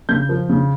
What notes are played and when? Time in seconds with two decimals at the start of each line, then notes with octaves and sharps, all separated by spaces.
0.09 C#3 G6
0.29 F3
0.49 C#3